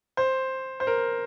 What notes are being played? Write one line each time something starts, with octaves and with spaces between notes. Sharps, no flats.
C5
C5
A#4